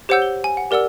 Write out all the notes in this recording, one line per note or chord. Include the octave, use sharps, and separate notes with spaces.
G4 C5 C#5 F#5 E6 G6
G7
G#5
F#5
G4 A#4 D5 F#5 E6